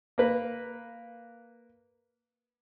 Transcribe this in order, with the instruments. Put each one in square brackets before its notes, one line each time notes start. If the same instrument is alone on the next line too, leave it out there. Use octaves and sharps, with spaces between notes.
[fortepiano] A#3 B4